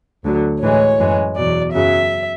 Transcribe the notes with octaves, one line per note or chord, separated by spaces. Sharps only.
D2 D3 F#3
A2 E3 G#3 C#5
F#2 E3 G#3
E2 B2 F#3 D5
F#2 C#3 F#3 E5